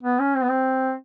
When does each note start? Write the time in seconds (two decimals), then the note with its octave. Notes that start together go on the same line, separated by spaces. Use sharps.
0.03 B3
0.20 C#4
0.35 C4
0.42 B3
0.50 C4